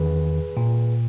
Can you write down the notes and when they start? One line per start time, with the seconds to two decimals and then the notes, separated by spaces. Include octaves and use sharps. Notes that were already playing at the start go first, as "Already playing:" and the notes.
Already playing: E2 D#3 G#4 B4
0.57 A#2